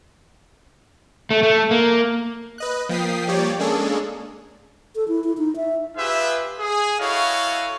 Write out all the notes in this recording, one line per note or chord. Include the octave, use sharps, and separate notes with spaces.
A3
A3
A#3
B4 D#5 F#6
F3 A#3 G5 D#6 B6 C7
F3 G3 A#3 G4 C#5 D5
G#3 A#3 C#4 D4 G#4 A4
A4
E4
E4
D#4
E5
F4 G4 G#4 B4 E5
G#4
E4 F#4 A4 C#5 D#5 F5